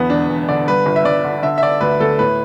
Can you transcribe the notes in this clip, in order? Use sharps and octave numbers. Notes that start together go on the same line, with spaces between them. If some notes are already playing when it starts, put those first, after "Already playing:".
Already playing: E2 D3 B3
E1 D4
E1
D3 D5
G2 B4
G1
E5
G1 D5
D3
D3 E5
E5
D3 D5
D2 B4
D2 A4
A2 B4